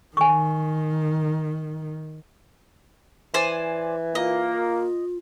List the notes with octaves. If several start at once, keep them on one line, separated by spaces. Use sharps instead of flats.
D#3 G#5 C#6
E3 C5 D5 G#5
A#3 F4 D#5